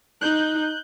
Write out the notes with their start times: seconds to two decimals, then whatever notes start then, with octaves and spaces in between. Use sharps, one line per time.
0.21 D#4 F#6 G6